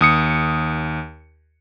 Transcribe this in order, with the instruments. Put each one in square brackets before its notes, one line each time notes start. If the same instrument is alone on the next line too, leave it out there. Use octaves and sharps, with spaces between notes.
[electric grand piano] D#2 D#6 C#7